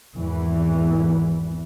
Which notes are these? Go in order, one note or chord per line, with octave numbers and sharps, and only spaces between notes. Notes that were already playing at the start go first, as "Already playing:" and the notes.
G#1 E2 E3